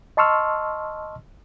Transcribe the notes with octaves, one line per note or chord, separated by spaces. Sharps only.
D#5 A5 C6 C#6 E6 F6